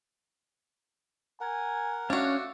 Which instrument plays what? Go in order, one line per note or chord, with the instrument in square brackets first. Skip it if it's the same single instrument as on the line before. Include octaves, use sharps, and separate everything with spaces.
[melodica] A#4 F#5 [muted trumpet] G#5
[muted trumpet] A3 [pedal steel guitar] C#4 F5 [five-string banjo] D4 F#4